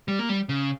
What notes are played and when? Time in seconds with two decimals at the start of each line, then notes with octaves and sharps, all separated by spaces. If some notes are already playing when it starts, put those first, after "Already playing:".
0.08 G3
0.19 A#3
0.29 G3
0.49 C#3